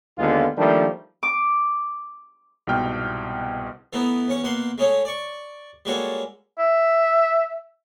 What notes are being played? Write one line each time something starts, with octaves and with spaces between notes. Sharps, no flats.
D#2 D3 G#3 B3 F4
D#3 F3 G3 A3 A#3 D4
D6
C2 G#2 B2 B3 G5 F6
E3 A3 B3 D#4 E4
E2 C#4 C#6
B2 A#3 F#5 C6
G#3 A3 C#4 D#4 C#5
D5 C#6
G3 G#3 A#3 F#4 A4 C#5
E5